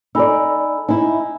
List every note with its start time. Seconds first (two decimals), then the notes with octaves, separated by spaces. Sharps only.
0.15 D#4 A4 D5 G#5 B5 E6
0.89 D#4 E4 G#5